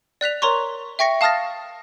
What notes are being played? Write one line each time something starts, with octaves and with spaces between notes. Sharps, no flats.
D5 F#6 B6 F7
A#4 C#5 A#5 C6 C#6
E5 G5 C#6 A#6 C#7
F5 A5 D#6 F6 A6 A#6